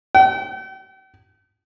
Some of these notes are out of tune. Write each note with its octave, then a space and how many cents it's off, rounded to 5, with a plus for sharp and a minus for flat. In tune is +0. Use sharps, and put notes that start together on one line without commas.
G5 -45